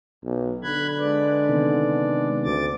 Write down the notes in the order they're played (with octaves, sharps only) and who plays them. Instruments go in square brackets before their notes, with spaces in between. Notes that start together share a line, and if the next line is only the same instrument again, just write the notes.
[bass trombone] B1
[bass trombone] D3 [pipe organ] B5 F#6 G#6
[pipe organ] G#3 D4 D5 [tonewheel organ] B4
[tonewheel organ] C3 D#3 B3
[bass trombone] D2 [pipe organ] D6 A6